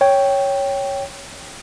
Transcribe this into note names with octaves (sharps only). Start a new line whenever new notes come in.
C#5 G5